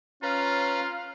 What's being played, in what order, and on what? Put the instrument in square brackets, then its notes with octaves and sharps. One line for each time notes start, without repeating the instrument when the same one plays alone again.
[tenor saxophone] C#4 [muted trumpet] F4 [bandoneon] B4 A#5 B5 [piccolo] F5